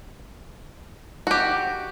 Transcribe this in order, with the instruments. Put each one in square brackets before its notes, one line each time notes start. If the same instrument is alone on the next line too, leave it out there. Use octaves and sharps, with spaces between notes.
[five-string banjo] F#4 G4